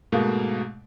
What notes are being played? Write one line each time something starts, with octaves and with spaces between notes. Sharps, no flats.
G#2 B2 A3 A#3